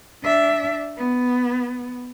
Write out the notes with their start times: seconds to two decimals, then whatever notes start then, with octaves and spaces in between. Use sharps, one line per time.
0.24 D4 E5
0.97 B3